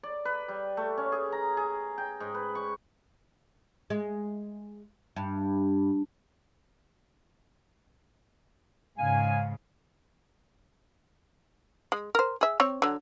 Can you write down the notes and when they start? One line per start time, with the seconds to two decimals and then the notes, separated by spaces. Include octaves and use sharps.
0.03 D5
0.25 B4
0.48 G3
0.77 A3
0.98 C#4
1.12 G#4
1.32 A#5
1.57 G#4
1.98 G5
2.20 G#2
2.34 B4
2.55 C#6
3.90 G#3
5.16 G2
8.99 G#2 C#3 F5 G#5
11.92 G#3
12.15 A#4 C5
12.41 G#4 E5
12.60 C4 C#5
12.82 D3 F#3